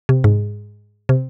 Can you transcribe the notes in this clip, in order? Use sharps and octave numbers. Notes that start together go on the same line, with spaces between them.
C3
G#2
C3